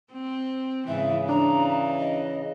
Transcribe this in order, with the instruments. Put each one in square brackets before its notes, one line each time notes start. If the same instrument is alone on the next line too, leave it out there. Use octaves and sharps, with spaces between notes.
[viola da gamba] C4
[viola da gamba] G#2 E3 [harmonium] C#3 [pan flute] E5
[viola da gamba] E3 [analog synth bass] D4 [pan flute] A#5
[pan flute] D#5